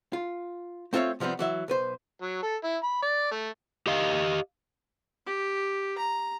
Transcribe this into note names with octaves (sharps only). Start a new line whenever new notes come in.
F4
A3 C4 F4 B4 C#5 E5
C3 F3 G3 B3 C4
E3 F#3 E5
B1 B4 C5
F#3
A4
E4
B5
D5
A3
G4 D#5 F5
G4
A#5